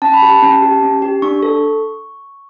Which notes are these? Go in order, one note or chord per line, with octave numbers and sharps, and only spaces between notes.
C#4 A5
B5
G4 A5
C#4
G4
C#4
G4
D4 C#6
A4